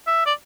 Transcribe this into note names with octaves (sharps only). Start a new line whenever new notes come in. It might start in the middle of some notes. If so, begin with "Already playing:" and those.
E5
D5